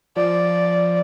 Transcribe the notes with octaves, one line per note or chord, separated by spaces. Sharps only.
F3 D5